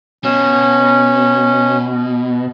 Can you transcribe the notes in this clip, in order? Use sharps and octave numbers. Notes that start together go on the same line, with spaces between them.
B2 C#4